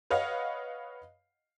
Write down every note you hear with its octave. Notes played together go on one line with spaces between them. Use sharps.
B4 C#5 D#5 F5 F#5